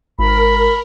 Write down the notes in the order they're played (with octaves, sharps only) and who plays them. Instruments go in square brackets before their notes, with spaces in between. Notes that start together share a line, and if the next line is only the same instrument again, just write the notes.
[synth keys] G#1 [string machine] A#4 [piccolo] B5